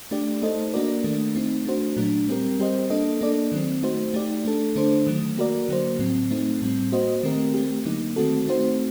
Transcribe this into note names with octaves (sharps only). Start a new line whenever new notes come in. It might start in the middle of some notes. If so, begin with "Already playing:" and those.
A3 D4 G4 D5
A3 D#4 A4 C5 D#5
A#3 D4 F#4 A#4 D5
D#3 A3 D4
A3 C4 D#4
A3 D4 F#4 C5
A#2 F#3 A3 D4
G3 C4 G4 A#4
G3 C4 G4 C5 D#5
A#3 D4 A4 D#5
A#3 D4 A4 D5
D#3 F#3 C4
A3 D#4 F#4 C5
A3 D#4 G4 D5
A3 D4 A4
D3 A3 D4 A4 C5
D#3 F#3 A3
A#3 F#4 A#4 D5
D3 F#3 A#3 F#4 C5
A2 F#3 C4
A3 C4 D#4
A2 G3 C4
A#3 F#4 C5 D#5
D#3 A3 C4 G4 A#4
A3 C4 G4
D3 F#3 A#3 D#4
D#3 A3 C4 F#4 A4
A3 C4 D#4 F#4 C5